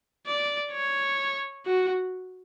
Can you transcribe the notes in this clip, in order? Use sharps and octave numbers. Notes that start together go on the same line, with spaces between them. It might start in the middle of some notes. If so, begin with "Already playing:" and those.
D5
C#5
F#4